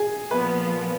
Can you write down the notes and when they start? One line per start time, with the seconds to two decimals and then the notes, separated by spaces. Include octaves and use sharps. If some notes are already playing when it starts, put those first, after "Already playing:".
Already playing: G#4
0.31 A#2 F3 B3 B4